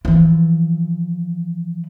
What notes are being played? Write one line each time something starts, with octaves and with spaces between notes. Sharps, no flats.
E3 F3